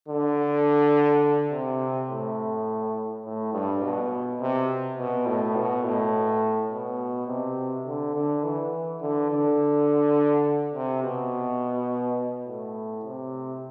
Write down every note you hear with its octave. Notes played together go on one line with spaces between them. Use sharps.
D3
C3
A2
A2
G2
B2
C3
B2
A2
B2
A2
B2
C3
D3
D3
E3
D3
D3
C3
B2
A2
C3